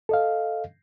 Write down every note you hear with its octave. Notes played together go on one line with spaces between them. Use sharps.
A4 D#5 F5